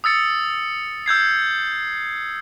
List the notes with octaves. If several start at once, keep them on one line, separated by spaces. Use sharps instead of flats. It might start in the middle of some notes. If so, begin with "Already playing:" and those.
D#6 E6 A6 C#7
E6 G6 G#6 C7